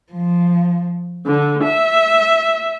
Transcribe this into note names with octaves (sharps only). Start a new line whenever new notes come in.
F3
D3
E5